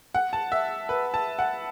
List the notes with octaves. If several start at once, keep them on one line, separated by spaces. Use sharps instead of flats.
F#5
A5
E5
B4
A5
F#5